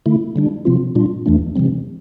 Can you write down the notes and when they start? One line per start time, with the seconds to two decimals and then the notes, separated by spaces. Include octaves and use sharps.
0.06 D3 A3 E4
0.36 D3 G3 D4
0.65 C3 F3 C4 F4
0.95 A#2 G3 D4 F4
1.26 E2 E3 A3 D4
1.55 C3 E3 G3 C4